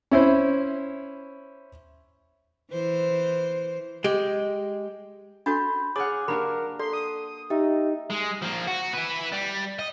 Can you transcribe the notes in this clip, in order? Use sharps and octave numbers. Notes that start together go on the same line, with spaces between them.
C#4 E4 C5
E3 C5
G#3 G4
D4 F#4 A4 B5 C6 G6 A6
G#4 C#5 F#5 D6 F6 A6
A#3 D4 F#4 G4 A#4 B5
A4 D5 C6
D#6
D#4 G4 E5
G#3
F3 A#3
F#4
E4 B4
G3
D#5